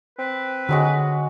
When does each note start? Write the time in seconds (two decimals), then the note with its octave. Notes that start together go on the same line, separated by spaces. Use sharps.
0.19 C4 B4
0.69 D3 F#3 G#3 F#4